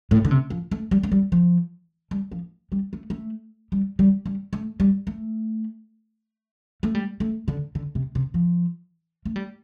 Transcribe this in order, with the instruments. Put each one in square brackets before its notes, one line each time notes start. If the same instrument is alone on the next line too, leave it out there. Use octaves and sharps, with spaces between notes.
[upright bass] A2
D3
C3
F3
A3
G3
A3
G3
F3
G3
F3
G3
A3
A3
G3
G3
G3
A3
G3
A3
A3
G3
A3
D3
D3
C3
C3
F3
A3
G3